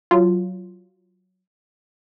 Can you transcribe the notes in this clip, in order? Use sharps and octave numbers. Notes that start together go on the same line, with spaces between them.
F#3 F4